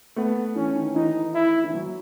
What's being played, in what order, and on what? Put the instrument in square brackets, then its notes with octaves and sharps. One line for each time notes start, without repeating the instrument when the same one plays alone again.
[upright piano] A3 [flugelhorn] B3
[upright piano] E3 [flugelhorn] C#4
[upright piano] D#3
[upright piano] E3 [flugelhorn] D#4
[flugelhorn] E4
[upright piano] E3
F#3